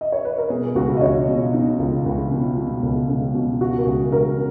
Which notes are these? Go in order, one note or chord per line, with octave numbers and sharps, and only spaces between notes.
D#5
C#5
B4
A#4
B2 G#4
G#4
C#2 F#4
D#5
C#2 C#5
B2 F4
B2 D#4
C#2 F4
C#2
B2
B2
C#2
C#2
B2
C#3 F#4
A#4
C#2 G#4
C#2 A#4